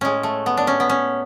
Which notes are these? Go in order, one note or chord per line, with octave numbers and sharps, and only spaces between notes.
A2 G#3 C#4
A3
B3
D4
C#4
B3
C#4